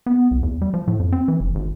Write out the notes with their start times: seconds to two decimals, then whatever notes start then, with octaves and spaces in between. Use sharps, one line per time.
0.06 B3
0.31 C2
0.43 E2
0.61 G3
0.74 F3
0.87 A2
0.99 F2
1.12 C4
1.28 E3
1.40 F#1
1.55 G#1